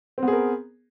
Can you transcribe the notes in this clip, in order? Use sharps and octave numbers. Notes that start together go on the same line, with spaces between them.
B3 C4 G#4 A#4